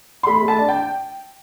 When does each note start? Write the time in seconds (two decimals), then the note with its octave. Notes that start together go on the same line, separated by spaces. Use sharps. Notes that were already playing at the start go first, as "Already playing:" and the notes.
0.23 C6
0.27 A3 B5
0.42 A3
0.48 A5
0.58 D4
0.69 G5